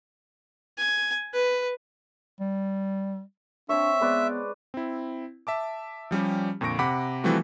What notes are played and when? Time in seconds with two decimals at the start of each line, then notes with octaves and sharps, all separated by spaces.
0.78 G#5
1.34 B4
2.40 G3
3.69 C4 D4 C#5 E5
4.01 G#3 B3 B4 D5
4.74 C4 E4
5.47 E5 A5 D6
6.11 F3 G3 C#4 G4
6.61 F2 A#2 D3 C#6 A#6 D7
6.79 C3 F#5 B5 D6 B6
7.24 E3 F3 G3 A3 C4 F#4